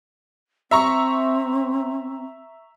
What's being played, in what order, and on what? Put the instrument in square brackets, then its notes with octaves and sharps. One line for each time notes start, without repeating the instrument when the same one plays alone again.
[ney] C4 [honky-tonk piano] E5 A#5 C#6